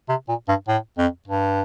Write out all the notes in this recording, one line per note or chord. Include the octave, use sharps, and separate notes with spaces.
C3
A#2
G2
A2
F2
G2